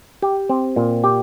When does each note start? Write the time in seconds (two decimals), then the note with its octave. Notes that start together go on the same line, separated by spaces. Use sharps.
0.22 G4
0.49 C4
0.76 A#2
1.04 G4